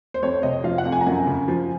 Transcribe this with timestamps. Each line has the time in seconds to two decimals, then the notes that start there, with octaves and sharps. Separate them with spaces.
0.14 C5
0.23 F2 C#5
0.43 C3 D#5
0.64 F3 F5
0.78 F#5
0.86 F2
0.92 G#5
1.01 A#5
1.07 F#2 G#5
1.27 C#3
1.48 F3